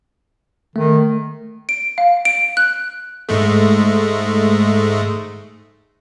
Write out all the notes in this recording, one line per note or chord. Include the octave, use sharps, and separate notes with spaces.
D#3 A3
D7
F5
D7
F#6
G#2 G#3 A3